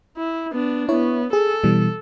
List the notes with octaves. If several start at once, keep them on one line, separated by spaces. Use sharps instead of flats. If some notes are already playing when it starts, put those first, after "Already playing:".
E4
B3 D4
B3 E4 C#5
G#4 A4
B2 E3 G3